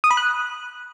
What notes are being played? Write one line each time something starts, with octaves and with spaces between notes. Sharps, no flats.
D#6
B5
F#6